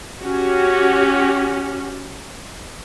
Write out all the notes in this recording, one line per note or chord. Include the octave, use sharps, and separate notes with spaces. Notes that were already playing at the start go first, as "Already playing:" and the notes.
C#4 F#4 G4